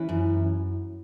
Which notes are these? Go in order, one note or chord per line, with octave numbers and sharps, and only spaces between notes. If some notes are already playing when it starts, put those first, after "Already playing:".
Already playing: E3 C#4 E4
F#2